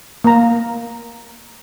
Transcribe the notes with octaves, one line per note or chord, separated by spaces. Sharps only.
A#3 A#5